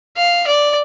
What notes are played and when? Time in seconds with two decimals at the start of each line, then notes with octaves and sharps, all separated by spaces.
0.17 F5
0.47 D5